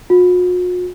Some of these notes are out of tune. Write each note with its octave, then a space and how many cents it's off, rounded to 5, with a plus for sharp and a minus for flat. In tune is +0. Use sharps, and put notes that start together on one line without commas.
F#4 -45